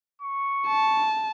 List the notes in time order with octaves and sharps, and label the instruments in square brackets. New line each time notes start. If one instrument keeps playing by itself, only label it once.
[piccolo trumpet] C#6
[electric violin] A5